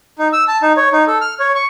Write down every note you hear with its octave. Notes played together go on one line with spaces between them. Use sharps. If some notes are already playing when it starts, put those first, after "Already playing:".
D#4
E6
A5
D#4
C#5
D#4
A4
F6
C#5
C#6